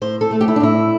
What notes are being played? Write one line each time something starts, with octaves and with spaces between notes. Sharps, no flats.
A2 C5
A4
A3
G4
E4
D4
A2 E4